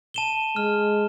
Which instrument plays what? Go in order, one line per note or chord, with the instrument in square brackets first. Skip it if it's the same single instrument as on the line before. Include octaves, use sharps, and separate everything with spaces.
[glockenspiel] A5 E7 G7
[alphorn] G#3 [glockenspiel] F6